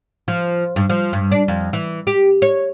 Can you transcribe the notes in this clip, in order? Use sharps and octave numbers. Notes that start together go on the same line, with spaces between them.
F3
G2
F3
G2
D4
F2
E3
G4
C#5